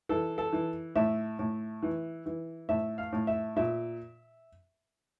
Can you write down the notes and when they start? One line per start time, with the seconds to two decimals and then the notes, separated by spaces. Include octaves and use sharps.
0.09 E3 A4
0.38 A4
0.53 E3
0.96 A2 E5
1.39 A2
1.83 E3
2.26 E3
2.69 A2 E5
2.98 F5
3.13 A2
3.27 E5
3.56 A#2 E5